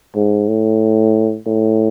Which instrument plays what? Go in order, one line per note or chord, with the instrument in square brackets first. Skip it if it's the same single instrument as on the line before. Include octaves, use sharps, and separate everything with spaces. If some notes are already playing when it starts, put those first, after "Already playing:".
[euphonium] G#2
A2
A2